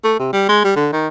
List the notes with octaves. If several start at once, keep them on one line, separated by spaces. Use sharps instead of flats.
A3
C3
G3
G#3
G3
D3
D#3